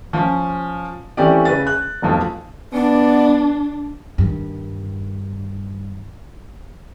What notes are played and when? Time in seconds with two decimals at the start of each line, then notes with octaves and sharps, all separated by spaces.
0.13 F3 C#4
1.17 E3 A3 C4 C#4 G4 D5
1.45 C#3 B4 A6
1.67 F#6
2.02 F1 B1 F3
2.73 B3 D4 D5
4.18 G2 D#3